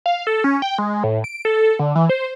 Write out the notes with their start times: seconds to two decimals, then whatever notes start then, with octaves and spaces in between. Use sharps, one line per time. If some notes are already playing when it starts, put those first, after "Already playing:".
0.06 F5
0.27 A4
0.44 C#4
0.62 G5
0.78 G#3
1.04 A2
1.24 D7
1.45 A4
1.79 D3
1.95 E3
2.09 C5